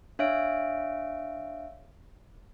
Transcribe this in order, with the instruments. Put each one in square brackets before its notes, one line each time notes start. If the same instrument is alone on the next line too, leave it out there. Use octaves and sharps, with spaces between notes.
[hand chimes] D4 C#5 E5 F5 D7